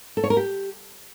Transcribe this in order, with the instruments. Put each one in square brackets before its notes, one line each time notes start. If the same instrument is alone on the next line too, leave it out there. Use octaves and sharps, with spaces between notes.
[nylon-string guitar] A4
C#5
A#4
G4